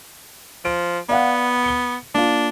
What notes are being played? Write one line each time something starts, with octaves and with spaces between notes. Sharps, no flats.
F3 D7
B3 D5 F5 F#5
C#7 G7
A#3 D4 F4